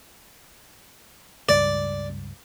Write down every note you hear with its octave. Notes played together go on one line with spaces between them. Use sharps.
C#2 G2 D5